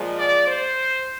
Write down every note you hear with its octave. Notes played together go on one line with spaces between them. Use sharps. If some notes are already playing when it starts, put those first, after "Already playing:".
Already playing: A#2 F3 G#3
D5
C5